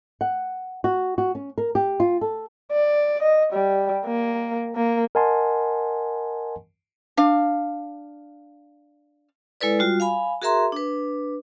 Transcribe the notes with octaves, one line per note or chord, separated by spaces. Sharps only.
F#5
F#4
F#4
C#4
A#4
G4
F4
A4
D5
D#5
G3
A#3
A#3
A#4 D#5 F#5 G#5 A5 C6
D4 F5
G#3 E4 A4 B4 D5
G3 F4 F#4
F5 G#5 B5
F#4 G#4 A#4 E5 A#5 C6
D4 B4